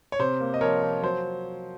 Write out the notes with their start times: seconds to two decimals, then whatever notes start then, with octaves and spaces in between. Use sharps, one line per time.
0.12 C#5
0.19 C3 C5
0.40 A#3
0.54 D#5
0.61 F3 A#4 C#5
0.83 F3
1.02 F#3 C5